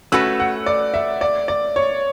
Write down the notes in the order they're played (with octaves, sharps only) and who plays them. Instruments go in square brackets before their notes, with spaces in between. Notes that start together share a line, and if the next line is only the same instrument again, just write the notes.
[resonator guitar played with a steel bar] A3 C#4 F#4 B4 [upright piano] E6
[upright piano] F#5
D5
E5
D5
D5
C#5